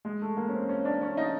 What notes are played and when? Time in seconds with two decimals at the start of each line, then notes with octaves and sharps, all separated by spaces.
0.05 G#3
0.21 A3
0.37 A#3
0.49 C#4
0.53 C4
0.69 C#4
0.85 D4
1.02 C#4
1.17 D#4